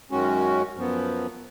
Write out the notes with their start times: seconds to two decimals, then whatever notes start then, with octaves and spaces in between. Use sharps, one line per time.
0.10 F#2 D#3 G#3 C#4 F#4
0.75 F#2 F3 B3